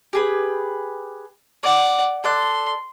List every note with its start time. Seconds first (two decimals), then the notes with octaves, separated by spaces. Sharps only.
0.13 G4 G#4 B4
1.63 D5 F#5 D6
2.24 A4 D5 C6 F#6